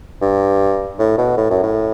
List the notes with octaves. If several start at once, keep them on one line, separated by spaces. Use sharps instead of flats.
G2
A2
B2
A2
F#2
A2